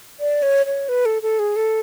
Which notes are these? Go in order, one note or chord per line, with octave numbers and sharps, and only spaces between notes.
D5
C#5
C#5
B4
A4
A4
G#4
A4